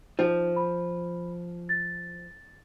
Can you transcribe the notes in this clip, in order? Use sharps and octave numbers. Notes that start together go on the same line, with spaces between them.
F3 D#4
B5
A6